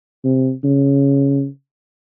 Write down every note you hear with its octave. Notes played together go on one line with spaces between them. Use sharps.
C3
C#3